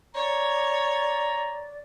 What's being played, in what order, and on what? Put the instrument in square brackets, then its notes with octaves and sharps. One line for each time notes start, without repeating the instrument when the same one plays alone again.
[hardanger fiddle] C#5 [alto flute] D5 [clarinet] A#5